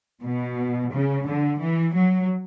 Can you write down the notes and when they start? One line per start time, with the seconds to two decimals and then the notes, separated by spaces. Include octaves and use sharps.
0.23 B2
0.92 C#3
1.27 D3
1.60 E3
1.95 F#3